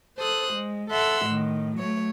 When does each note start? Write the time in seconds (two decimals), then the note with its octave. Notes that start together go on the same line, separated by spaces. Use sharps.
0.18 A4 C5 D#6 F#6
0.52 G#3
0.89 A4 E5 F#5 C6 E6
1.25 A2 D#3
1.77 F#3 A3 C#5